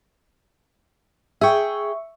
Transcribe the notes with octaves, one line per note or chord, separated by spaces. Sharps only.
G#4 E5 G5 C#6